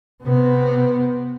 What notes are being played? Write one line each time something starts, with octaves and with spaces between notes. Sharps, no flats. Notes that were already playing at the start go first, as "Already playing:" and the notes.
C3 B3